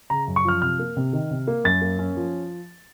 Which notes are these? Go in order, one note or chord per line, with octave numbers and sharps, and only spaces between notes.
C#3 A#5
F#2
C#6
F3 F6
C3 F6
A#3
C3
D#3
C3
A#3
F#2 A6
A#3
C#4
F3